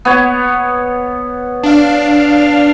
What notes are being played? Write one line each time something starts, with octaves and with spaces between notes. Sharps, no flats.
B3 C#5
D4 F5